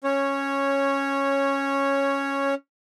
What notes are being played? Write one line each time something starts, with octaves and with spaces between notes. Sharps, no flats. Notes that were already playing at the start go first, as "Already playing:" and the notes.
C#4 C#5